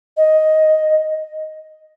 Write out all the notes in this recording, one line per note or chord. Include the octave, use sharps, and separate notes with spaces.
D#5